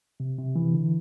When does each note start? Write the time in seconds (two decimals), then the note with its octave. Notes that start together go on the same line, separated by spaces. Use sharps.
0.20 C3
0.38 C3
0.56 E3
0.74 D3